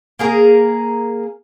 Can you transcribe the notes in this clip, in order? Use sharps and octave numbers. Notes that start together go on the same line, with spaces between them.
A#3 G#4 A#4